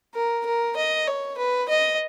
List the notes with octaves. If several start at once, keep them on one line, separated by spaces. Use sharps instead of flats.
A#4
A#4
D#5
C#5
B4
D#5